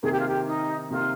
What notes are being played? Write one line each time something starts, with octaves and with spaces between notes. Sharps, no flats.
C3 D#3 A#3 G#4
G4
F4
G4
D#4
C3 D#3 A#3 F4